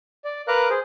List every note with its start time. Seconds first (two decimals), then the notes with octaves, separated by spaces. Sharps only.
0.24 D5
0.48 A#4 B4 F5 A#5 D6 F#6
0.70 G#4 C5